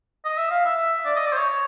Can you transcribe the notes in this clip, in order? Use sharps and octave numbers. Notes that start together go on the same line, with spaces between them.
D#5
E5
F5
E5
D5
D#5
D5
C5
C#5